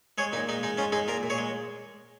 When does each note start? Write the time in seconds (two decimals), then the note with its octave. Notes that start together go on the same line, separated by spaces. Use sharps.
0.18 G#3 G#4 C#5
0.33 A#2 D#4
0.49 G#3 D#4
0.63 G#3 D#4
0.77 G#3 C#4 F4
0.92 G#3 D#4 G#4
1.08 A#2 F4 A#4
1.23 A#2
1.30 G#4 C#5
1.38 G#3